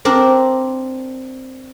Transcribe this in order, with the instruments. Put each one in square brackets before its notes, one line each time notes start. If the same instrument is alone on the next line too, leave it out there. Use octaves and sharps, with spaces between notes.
[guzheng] C4 D4 A#4 D5